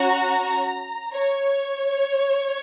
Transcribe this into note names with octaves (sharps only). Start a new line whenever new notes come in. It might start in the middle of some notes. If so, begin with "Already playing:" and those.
Already playing: C#4 F#4 A#5
C#5